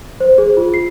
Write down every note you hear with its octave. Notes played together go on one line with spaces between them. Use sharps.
C5
G#4
F4
C7